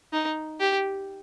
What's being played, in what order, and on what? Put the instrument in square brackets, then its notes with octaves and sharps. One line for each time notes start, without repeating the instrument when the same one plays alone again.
[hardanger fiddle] D#4
G4